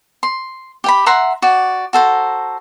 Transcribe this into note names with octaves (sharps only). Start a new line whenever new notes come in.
C6
G4 G5 B5
E5 F#5 A#5 C6
F#4 D5
F#4 A4 C5 A#5